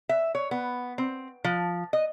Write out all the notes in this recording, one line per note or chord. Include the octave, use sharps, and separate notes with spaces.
E5
C#5
B3
C4
F3
D#5